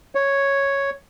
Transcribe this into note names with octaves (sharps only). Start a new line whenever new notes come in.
C#5